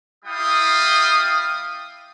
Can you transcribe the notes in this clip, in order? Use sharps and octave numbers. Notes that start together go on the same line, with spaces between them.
G3 E4 F5 G5 D#6